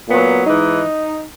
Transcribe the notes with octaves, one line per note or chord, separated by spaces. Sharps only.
A#2 F#3 B3
G#2 E3 D#4